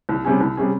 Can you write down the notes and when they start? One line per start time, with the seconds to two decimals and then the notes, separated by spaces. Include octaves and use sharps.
0.09 C2
0.25 C3 G3 C#4 G#4
0.40 C2
0.57 C3 G3 C#4 G#4